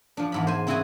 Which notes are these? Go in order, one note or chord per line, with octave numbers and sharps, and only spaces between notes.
F3 D4
E2 G#2 B5
C5 G#5
C#3 C4 E4 F#4 G#4 G#5